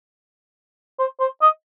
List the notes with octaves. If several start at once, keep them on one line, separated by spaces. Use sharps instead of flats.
C5
C5
D#5